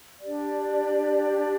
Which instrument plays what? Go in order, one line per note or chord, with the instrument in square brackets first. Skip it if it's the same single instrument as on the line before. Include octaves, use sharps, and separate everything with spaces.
[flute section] D4 G4 D5